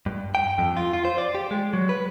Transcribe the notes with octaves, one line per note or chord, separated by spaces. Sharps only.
G2
G5
F2
F4
F4
C5
D5
G4
G#3
F#3
B4